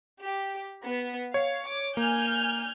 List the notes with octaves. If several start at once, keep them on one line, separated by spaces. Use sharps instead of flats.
G4
B3
C#5 F5
D6
A#3 G#5 F6 G6